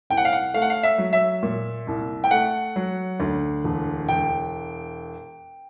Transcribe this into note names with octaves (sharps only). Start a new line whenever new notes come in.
C2 G5
F#5
F5
F#5
A3 F5
F#5
F5
E5
F#3
E5
A#2
C2
G5
A3 F#5
F#3
D2
E1
E1 G5